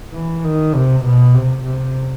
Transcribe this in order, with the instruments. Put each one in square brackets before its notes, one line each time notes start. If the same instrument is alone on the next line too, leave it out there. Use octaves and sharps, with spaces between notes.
[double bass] E3
D#3
C3
B2
C3
C3